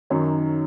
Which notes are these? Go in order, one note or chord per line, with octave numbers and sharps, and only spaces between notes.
F#2 D#3 F#3 C#5